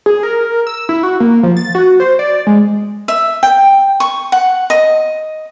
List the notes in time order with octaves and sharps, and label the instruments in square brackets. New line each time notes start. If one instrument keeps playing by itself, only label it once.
[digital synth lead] G#4
A#4
E6
E4
F#4
A#3
F3
A6
F#4
C5
D5
G#3
[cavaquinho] E5
G5
C#6
F#5
D#5